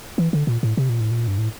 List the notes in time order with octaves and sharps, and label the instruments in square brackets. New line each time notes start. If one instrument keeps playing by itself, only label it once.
[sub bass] E3
D3
A#2
A2
C3
A#2
A2
A#2
G2
A2